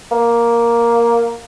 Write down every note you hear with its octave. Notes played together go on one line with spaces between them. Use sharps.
A#3